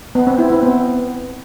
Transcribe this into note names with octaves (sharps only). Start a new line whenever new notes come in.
B3
C4
E4
C4
B3